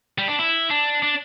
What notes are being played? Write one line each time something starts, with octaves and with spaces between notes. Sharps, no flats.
G3
D4
E4
D4
D4